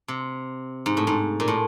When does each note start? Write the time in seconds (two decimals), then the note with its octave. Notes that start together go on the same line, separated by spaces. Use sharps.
0.08 C3
0.86 G#2
0.97 A2
1.07 G#2
1.40 A#2
1.48 A2